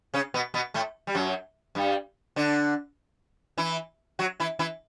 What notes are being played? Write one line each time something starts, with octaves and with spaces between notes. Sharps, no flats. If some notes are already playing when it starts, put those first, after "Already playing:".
C#3 C#4
B2 B3
B2 B3
A2 A3
G3
F#2 F#3
G2 G3
D3 D4
E3 E4
F#3 F#4
E3 E4
E3 E4